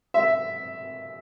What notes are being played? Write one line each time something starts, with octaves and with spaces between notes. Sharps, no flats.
E5